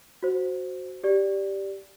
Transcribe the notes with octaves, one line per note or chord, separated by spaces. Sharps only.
F#4 C5
G4 D5